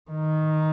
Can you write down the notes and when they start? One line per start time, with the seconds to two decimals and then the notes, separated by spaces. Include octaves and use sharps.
0.11 D#3